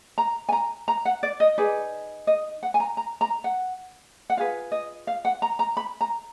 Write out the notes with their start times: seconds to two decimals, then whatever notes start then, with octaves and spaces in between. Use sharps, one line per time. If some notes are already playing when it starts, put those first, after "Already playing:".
0.18 A#5
0.49 G#5
0.52 A#5
0.88 A#5
1.05 F#5
1.23 D5
1.40 D#5
1.58 D#4 G#4 B4 D5
2.27 D#5
2.63 F#5
2.74 G#5
2.80 A#5
2.97 A#5
3.21 A#5
3.44 F#5
4.30 F#5
4.37 F4 G#4 B4 F5
4.72 D#5
5.07 F5
5.25 F#5
5.42 A#5
5.59 A#5
5.77 B5
6.01 A#5